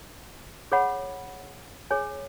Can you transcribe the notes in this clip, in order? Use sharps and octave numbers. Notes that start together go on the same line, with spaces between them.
G#4 C#5 F#5 B5
G#4 C#5 G#5